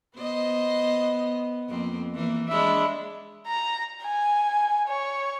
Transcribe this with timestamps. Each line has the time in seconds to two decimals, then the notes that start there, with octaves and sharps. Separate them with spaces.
0.17 B3 C5 D#5
1.69 F2 A#3 C4
2.14 E3 A#3
2.48 G#3 D4 E5 B5
3.47 A#5
4.03 G#5
4.88 C#5